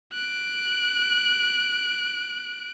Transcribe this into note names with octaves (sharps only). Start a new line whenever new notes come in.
F#6 D7